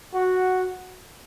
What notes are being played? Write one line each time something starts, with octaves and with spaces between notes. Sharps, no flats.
F#4